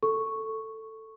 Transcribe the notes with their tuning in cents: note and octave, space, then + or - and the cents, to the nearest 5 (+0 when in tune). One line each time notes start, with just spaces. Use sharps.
A4 +10 C#6 +0